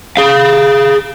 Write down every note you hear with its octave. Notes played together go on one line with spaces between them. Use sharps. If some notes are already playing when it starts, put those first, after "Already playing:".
G#4 F5